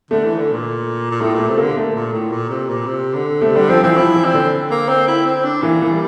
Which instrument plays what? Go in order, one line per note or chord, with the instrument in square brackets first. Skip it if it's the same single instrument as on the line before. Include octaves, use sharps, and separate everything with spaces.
[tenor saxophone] D3 [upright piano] A3
[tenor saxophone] E3
D3
A#2
A#2
[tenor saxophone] A2 [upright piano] A3
[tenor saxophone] A#2 [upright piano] A3
[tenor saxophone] C3
[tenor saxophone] D3 [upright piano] A#3
[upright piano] A3
[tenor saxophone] A#2
A2
A#2
C3
A#2
C3
D3
[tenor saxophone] C3 [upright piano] A3
[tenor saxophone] D3 [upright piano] G3
[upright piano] F3 [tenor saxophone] C4
[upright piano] E3 [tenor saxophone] C4
[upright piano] F3 [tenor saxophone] E4
[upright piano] E3
[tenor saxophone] C4
[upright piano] D3
[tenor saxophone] A#3
C4
E4
C4
D4
[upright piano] E3 [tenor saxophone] A#3
[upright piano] E3
[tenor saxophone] G3